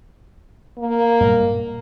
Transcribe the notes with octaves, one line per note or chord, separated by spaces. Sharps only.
A#3
G2 A#2